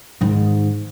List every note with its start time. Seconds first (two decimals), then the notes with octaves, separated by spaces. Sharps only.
0.21 G#2 D#3